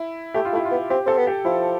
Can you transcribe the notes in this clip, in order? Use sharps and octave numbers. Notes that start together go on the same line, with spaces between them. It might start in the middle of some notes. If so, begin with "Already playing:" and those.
Already playing: E4
A3 G4
F4
A3
E4
F4
B3
C4 G4
C4 A4
B3
G4
F3 E4